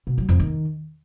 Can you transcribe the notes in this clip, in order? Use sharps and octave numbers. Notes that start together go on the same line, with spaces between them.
B2
F#3
F2
D#3